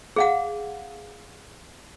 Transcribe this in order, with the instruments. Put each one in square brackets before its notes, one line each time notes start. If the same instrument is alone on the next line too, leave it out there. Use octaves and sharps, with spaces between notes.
[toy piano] G#4 F5 F#5